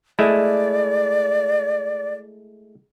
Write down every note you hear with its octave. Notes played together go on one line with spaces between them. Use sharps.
G#3 A3 E4 D5